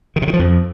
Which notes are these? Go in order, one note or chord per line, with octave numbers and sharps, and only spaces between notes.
D#3
C3
D#3
F3
F2